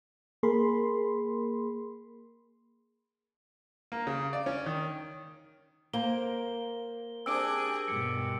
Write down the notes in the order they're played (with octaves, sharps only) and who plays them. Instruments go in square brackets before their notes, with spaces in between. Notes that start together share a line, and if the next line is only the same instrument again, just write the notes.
[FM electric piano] A#3 G#4 A#4 B5 C6
[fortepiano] A#3
C#3
D5
C#4
D#3
[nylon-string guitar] A#3 [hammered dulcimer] A#4 C5 [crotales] G7
[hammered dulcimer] C4 D4 G4 [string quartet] G#4 [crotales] E6 D7
[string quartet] G2 B2 [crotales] C#7